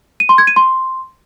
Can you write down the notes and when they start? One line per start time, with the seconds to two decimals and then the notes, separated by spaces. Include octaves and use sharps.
0.20 D#7
0.29 C6
0.38 G#6
0.47 D#7
0.56 C6